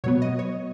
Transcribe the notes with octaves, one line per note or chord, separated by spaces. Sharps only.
B2 F#3 B3 C#5
D#5
C#5